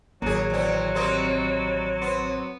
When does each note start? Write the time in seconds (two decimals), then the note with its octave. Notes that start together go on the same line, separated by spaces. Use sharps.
0.22 A1 F#2 D#3 F#3 A#3 G#4
0.50 E2 C4
0.95 G3 A#3 C4 D#5
2.02 B3 C4